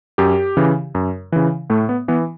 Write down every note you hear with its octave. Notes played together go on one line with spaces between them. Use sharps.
F#2 G4
C#3 E3
F#2
C#3 E3
A2 A3
B3
E3 B3